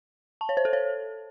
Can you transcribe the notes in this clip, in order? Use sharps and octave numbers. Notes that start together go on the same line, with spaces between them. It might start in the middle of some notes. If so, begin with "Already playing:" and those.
A5
C#5
C5
A4
C#5